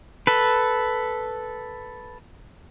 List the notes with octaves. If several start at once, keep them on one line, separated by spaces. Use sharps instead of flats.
A4 B4